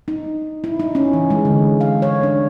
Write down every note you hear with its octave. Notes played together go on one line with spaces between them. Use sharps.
D#4
E4
D#4
C#4
E3
G#3
D3
F5
C#5
D4